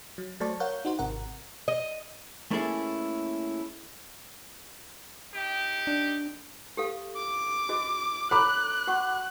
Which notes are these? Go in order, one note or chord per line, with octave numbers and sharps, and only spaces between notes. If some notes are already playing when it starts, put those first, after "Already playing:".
F#3
F#3 A3 C5 D5 A5 C#6
A#4 C#5 F5 F#5 G6
D#4 F#4 C5
G#1 C3 A#4 F#5
D#5
A3 A#3 C#4 E4 G#4 A4
D#4 G4
D4
G4 A4 F5
D6
F#4 G#4 D#5
A4 C#5 A#5 B5 D6 F#6
F#4 F#5 C#6